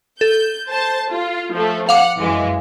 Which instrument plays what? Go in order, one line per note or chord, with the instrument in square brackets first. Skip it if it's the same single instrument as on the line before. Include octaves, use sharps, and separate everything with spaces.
[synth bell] A4 [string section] G6
[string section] C5 A5
F4
F3 A3
[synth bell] F5 D6 [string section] F#5
[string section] F#2 E3 G#3